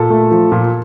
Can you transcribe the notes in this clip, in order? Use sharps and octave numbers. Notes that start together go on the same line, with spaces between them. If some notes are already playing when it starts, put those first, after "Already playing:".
Already playing: A#2 A4
A3
F3
A#2